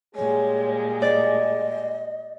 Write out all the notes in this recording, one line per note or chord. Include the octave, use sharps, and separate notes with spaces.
A#2 G3 G#3 G#4 C#5
D5 D#5